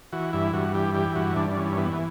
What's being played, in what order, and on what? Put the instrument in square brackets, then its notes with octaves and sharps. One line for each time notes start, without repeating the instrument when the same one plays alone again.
[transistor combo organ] E3 F#4
G2 E4
G2 F#4
E3 G4
E3 G4
G2 F#4
G2 D4
D4
E3 C#4
C#4
E3 B3
B3